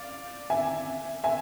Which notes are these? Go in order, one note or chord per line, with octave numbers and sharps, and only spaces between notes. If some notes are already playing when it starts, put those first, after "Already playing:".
Already playing: D5 F5
E5 G#5
E5 G#5